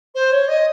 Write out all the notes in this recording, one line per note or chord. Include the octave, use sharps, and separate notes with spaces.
C5
C#5
D#5